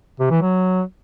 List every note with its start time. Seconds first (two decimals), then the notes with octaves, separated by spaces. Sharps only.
0.20 C3
0.31 E3
0.42 F#3